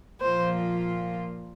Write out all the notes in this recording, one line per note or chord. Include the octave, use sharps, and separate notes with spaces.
A#2 F3 A#3 F4 C5